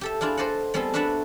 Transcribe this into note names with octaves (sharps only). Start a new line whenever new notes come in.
G4 A4 E5
D4 E4 F4 G#4 D5
A4 C5 D5 D#5 F#5
G3 B3 C4 G#4 A4
D4 F#4 B4 E5 F#5 A5